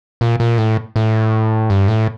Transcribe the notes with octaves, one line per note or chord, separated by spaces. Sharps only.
A#2
A#2
A2
A2
G2
A2